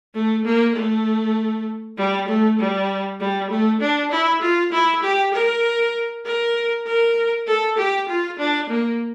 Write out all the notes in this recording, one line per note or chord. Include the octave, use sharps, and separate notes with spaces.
A3
A#3
A3
G3
A3
G3
G3
A3
D4
E4
F4
E4
G4
A#4
A#4
A#4
A4
G4
F4
D4
A#3